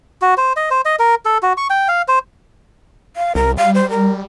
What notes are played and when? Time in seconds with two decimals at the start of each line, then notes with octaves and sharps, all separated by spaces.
0.22 F#4
0.38 C5
0.56 D#5
0.71 C5
0.85 D#5
0.99 A#4
1.25 A4
1.43 F#4
1.57 C#6
1.70 G5
1.88 F5
2.08 C5
3.16 F5
3.35 C2 A#4
3.57 G3 F5
3.75 C5
3.90 A#4